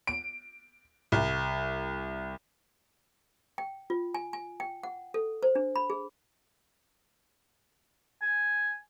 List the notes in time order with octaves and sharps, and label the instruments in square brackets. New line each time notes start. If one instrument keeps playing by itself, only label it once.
[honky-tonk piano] D7
C2
[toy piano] G5
F4
G#5
G#5
G5
F#5
A4
C5
D4
B5
G#4
[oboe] G#5